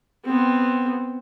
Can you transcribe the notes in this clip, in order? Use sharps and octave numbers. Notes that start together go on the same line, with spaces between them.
B3 C4